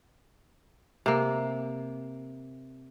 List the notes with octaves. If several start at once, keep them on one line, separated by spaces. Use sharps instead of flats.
C3 A#3